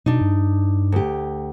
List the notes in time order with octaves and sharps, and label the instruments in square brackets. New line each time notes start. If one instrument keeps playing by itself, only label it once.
[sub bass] B2 [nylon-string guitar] D4 D#4
[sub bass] G2
[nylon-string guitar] D2 G4